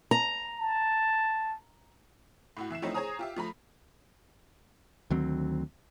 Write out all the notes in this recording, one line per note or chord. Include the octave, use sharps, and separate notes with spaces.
A#5
A5
A2 E4 F#4
E3 E5 C7 E7
F3 A3 C4 C#4 D#4 E4
G#4 C5 C#5 G#5 A#5 D#6
F4 G4 E5
F3 A3 A#5 B5
D2 D#3 F#3 C4